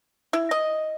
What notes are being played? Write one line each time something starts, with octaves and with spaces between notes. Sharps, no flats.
E4
D#5